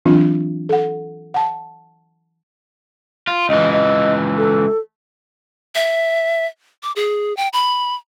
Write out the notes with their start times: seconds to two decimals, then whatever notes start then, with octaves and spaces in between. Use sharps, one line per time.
0.06 E3 F#3 C4 D4 F4
0.69 A4 F#5
1.34 F#5 A5
3.27 F4
3.49 C#2 E3 D#5
3.73 D#5
4.37 A4
5.75 E5
6.83 D6
6.96 G#4
7.37 G5
7.53 B5